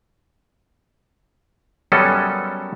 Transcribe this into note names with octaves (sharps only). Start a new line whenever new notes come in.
F#2 G3 B3 C#4 A4 D#5